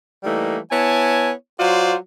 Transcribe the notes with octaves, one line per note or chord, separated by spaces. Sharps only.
E3 G3 A3 A#3 D#4
B3 E4 C#5 G#5 A5
F#3 F4 F#4 C5 D5